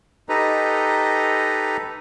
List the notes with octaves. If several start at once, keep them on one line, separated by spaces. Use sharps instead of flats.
D#4 G4 A4 B4 D#5 A#5